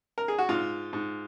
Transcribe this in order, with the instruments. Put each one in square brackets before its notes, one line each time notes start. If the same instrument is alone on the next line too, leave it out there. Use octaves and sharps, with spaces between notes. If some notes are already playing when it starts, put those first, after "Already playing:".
[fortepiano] A#4
G#4
F#4
G#2 F4
G#2